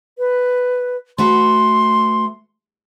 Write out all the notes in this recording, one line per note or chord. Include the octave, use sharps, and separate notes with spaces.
B4
A3 F#4 B4 C6